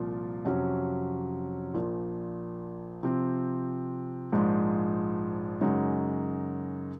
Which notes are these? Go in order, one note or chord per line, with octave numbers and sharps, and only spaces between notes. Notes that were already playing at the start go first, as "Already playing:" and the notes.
Already playing: C2 A#2 F3 A#3 F4
F2 C3 F#3 C#4
A#1 A#2 F3
C3 F3 C4
A#1 G#2 F3 G#3
F#2 C#3 G#3 D#4 F#4